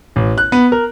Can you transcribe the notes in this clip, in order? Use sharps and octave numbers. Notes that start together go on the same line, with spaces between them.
A1
F#6
B3
A#4